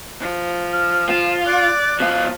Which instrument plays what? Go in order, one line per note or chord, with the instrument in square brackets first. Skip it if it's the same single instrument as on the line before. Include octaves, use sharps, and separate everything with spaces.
[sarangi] F3
[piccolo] F6
[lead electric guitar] F4 [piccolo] E7
[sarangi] D5 [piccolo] F#6
[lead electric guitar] B2 F5 [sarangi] F3